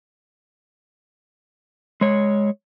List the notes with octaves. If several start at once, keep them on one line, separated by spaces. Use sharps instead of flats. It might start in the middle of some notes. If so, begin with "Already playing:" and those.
G#3 C#5